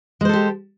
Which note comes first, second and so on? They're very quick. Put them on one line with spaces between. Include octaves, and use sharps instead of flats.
G#3 C5 A4 G4